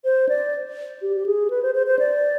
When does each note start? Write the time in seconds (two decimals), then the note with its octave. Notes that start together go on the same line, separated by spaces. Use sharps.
0.05 C5
0.29 D5
1.02 G4
1.16 G4
1.26 G#4
1.50 B4
1.63 C5
1.75 C5
1.87 C5
1.99 D5